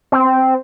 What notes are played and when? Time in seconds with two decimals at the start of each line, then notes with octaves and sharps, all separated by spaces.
0.12 C4